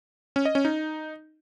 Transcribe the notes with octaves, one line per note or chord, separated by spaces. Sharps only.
C#4
D#5
C#4
D#4